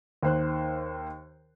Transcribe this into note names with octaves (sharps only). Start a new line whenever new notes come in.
D#2 C5 F#6